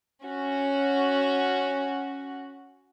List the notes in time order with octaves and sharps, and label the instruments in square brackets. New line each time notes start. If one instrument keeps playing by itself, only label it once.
[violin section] C#4 F#4